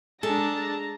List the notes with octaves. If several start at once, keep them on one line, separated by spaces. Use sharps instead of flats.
G#3 D4 G#4 A4 A5 A#5